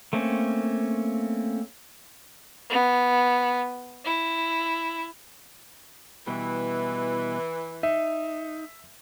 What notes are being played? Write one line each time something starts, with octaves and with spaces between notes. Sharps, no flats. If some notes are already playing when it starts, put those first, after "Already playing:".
A3 A#3 C4 C#4
B3
E4
B2 E3 G3
D#4 E5